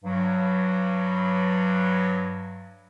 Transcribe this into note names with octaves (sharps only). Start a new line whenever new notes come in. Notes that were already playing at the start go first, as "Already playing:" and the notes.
G2 F#3